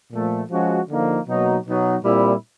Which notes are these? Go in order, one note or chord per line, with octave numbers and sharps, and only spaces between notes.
A#2 F3 A3
F3 G#3 C#4 F#4
D3 F3 A#3 D#4
B2 F#3 A#3 D#4
B2 F#3 B3 D#4 F#4
A#2 G3 C4 E4